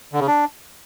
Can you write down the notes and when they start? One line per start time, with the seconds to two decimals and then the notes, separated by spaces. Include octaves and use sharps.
0.13 D3
0.20 C#3
0.27 D4